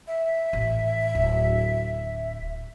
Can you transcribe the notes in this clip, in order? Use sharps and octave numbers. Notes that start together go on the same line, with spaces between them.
E5
A1
D1